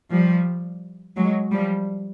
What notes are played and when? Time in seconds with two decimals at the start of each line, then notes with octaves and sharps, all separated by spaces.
0.10 F3 G3
1.16 F#3 G#3
1.52 F3 G3